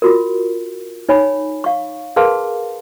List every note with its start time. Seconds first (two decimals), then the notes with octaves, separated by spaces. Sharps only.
0.02 F4 F#4 A#4
1.09 D#4 C#5 G#5 B5
1.64 F5 C#6
2.16 G#4 A#4 B4 F5 A5 C6